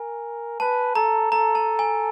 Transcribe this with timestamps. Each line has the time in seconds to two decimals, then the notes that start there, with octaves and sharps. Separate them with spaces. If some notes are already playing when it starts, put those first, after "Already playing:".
Already playing: A#4 G#5
0.60 B4 A5
0.95 A4 A#5
1.31 A4 A#5
1.55 A5
1.79 G#5